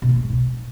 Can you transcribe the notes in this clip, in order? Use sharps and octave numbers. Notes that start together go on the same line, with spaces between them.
B2
A#3
A#2
G#2
B2